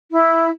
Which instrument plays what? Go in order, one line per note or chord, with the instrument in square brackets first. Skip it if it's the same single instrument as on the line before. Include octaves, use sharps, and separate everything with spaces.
[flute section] E4